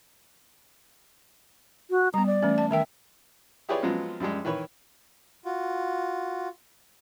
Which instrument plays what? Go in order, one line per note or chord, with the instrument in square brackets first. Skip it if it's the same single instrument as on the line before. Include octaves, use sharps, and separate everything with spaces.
[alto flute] F#4
[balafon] G3 B3 [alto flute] A#5
[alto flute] D5
[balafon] E3 A3 C#4
A5
[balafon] D#3 A#4 G5 [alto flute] E5
[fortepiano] E4 G4 G#4 B4 C#5 D5
F3 F#3 G#3 B3 C4 F4
F#2 F3 G3 G#3
D#3 E3 B4 C#5
[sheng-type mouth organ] F4 F#4